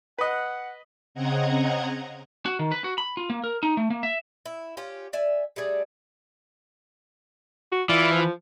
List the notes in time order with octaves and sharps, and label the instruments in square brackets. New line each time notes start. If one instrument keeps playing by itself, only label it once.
[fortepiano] B4 D#5 [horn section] F#5
[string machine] C#3 C4 D#5 F#5 A#5 G#6
[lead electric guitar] F#4
D#3
B4
F#4
B5
F4
A#3
A#4
D#4
A3
A#3
E5
[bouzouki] E4
C#4 F4 G4
D5 E5 G#5
G3 A3 G#4 D5
[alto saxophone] F#4
[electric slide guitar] E3 [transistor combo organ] E4 F4 [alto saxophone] D5
[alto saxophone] F3